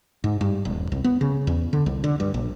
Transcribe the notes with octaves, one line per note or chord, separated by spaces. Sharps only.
G#2
G2
D#1
C2
B3
C#3
E2
D3
C2
D3
G2
A#1